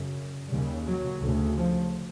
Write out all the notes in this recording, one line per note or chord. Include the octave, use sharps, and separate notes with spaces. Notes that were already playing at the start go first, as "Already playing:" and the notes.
Already playing: F#2 C#3
D#2 C#3 G3
F#3
D2 C#3
F3